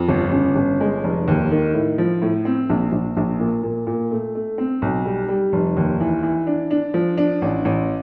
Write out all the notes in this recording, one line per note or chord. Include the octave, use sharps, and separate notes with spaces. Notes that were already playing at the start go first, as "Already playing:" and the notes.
Already playing: F2
G1
C#3
G1
G#3
F1
D#2
D#3
A2
F3
A2
C4
A#1
A#1
A#1
A#2
A#2
A#2
A3
A3
C4
B1
G3
G3
F1
D#2
E3
E3
D4
D4
F3
D4
A1
A1